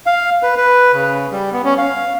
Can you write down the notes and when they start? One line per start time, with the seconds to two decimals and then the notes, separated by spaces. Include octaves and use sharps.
0.06 F5
0.43 B4
0.57 B4
0.94 C#3
1.32 G3
1.52 B3
1.64 C#4
1.78 F5